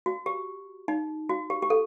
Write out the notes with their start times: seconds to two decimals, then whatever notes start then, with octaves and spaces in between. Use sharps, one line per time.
0.06 F#4
0.26 G4
0.88 D#4
1.29 F#4
1.50 G4
1.62 G4
1.70 A4